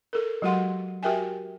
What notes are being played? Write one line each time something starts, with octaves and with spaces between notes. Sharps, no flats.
A4 A#4
F#3 G#3 F#4 G4 F#5 C6
F#4 G4 A#4 E5 G5 G#5